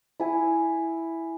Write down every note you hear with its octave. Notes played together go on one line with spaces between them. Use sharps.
E4 G#5